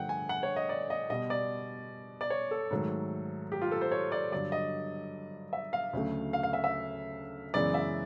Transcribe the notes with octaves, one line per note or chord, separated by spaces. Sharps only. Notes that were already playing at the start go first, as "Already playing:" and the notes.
Already playing: G2 D3 F3 A3 F#5 G5
G#5
F#5
C#5
D#5
D5
D#5
B2 G3 B3 D#5
D5
D5
C#5
A4
G#2 D#3 F#3 A3
G4
F4
A4
C5
C#5
D5
G2 D3 F#3 D5
D#5
E5
F5
D2 C#3 F#3 A3
F5
F5
E5
E5
F#2 C#3 E3 G#3 B3 D5
E5